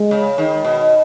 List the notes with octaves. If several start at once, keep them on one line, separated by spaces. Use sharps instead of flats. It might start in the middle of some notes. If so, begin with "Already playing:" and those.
Already playing: G#3
C#3
D#3
B2